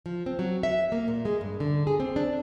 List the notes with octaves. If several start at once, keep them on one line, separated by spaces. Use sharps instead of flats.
F3
C4
F#3
E5
A#3
A#2
G#3
G2
D3
G#4
C4
D4